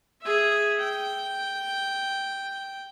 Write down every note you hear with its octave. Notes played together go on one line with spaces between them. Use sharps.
G#4 E5
G5